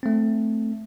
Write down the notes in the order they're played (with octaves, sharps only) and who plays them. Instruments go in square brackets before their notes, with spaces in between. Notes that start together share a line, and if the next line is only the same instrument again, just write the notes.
[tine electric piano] A3 C4